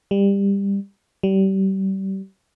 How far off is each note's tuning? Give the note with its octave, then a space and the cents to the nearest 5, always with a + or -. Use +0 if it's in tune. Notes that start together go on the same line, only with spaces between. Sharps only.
G3 +20
G3 -30